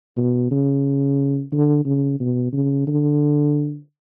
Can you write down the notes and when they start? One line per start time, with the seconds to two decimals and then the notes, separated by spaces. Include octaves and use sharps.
0.18 B2
0.51 C#3
1.53 D3
1.86 C#3
2.20 B2
2.53 C#3
2.87 D3